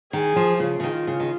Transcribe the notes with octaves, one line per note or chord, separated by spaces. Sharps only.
D#3 G#4
F3
C#3 F4
C#3
D#3
C#3
D#3